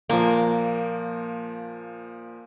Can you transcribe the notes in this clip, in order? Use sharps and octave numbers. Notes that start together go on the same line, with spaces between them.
A#2 F3 A#3